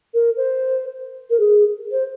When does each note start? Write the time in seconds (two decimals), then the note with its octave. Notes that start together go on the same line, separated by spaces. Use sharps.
0.14 A#4
0.37 C5
1.30 A#4
1.40 G#4
1.92 C5